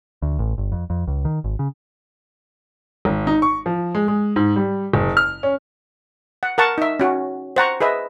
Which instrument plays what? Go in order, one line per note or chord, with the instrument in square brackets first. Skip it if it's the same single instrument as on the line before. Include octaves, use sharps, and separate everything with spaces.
[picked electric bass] D2
A1
G1
F2
F2
C#2
D#3
G#1
C#3
[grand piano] G#1
D#4
C#6
F3
G#3
G#3
G#2
G3
F#1
F6
C#4
[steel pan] F#5
A#4 F#5 A5 C#6
D#4 E5
C#4 F#4
C5 F#5 A#5 C#6
G#4 B4 D#5 E5